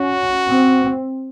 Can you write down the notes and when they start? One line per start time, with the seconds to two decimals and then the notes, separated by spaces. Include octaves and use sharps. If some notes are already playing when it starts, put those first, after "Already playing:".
Already playing: C#4 F#4
0.46 C4